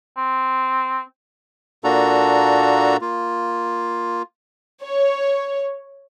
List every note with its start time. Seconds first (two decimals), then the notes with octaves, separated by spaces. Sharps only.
0.17 C4
1.84 A#2 A#3 D4 F#4 A4 A#5
3.01 A#3 F4
4.83 C#5